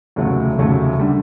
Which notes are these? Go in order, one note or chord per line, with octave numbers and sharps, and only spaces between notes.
F1 D#2 C#3 F#3 A3
F1 D#2 C#3 F#3 A3
D3 G3